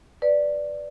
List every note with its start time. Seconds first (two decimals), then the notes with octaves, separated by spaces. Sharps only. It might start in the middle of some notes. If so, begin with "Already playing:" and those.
0.22 B4 D5